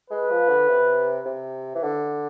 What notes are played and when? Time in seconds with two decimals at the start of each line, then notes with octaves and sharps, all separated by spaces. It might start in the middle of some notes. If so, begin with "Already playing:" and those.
0.11 G#3 B4
0.30 F3
0.49 D3
0.68 C3
1.25 C3
1.75 E3
1.83 D3